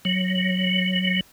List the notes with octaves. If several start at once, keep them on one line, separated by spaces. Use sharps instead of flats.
F#3